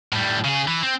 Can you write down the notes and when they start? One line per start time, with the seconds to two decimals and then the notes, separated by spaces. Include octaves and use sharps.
0.13 A2 G3
0.44 C#3 G#4
0.68 E3
0.83 C4